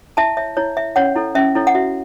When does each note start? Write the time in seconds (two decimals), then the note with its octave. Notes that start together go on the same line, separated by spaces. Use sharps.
0.17 E4 E5 A5
0.37 C#5 E5
0.57 E4 C#5
0.77 C#5 E5
0.96 C#4 C#5 F#5
1.16 E4 A4 C#5
1.35 C#4 E5
1.55 E4 A4 C#5
1.67 F#5
1.75 F#4 E5